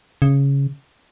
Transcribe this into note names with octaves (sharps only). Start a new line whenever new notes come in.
C#3